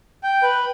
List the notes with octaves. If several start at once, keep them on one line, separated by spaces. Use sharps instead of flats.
G5
B4